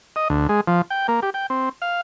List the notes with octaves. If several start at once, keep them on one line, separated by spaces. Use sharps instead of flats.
D#5
D2
G#3
F3
G5
A#3
G4
G5
C4
F5